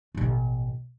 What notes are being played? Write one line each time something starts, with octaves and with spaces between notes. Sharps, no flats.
A1 B2